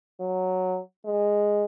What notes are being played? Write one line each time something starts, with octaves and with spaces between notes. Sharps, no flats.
F#3
G#3